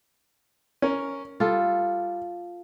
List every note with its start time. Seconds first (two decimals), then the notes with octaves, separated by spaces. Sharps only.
0.82 C#4 A#4
1.40 G3 F4 A4